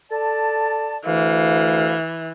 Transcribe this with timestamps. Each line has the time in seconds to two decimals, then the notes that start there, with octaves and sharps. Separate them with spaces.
0.11 A4 D5 A5
1.05 D2 E3 A3 F5